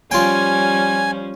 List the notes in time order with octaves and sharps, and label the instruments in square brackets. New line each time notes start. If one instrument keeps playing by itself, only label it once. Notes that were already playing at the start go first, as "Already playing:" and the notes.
[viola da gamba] F3 G3 C#4 [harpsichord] F4 G5 [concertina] G#5